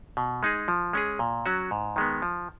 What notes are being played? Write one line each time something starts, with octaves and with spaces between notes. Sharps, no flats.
B2
G#3 D#4 G#4
F3
G#3 C#4 G#4
A#2
F#3 C#4 F#4
G#2
D#3 G#3 B3
F3